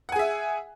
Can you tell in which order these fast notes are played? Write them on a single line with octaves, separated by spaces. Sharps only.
F#5 G#5 G#4 E5